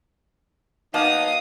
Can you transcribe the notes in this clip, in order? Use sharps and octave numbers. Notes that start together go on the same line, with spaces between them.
D#3 F#3 A#3 B3 D#4 F5 A5 D#6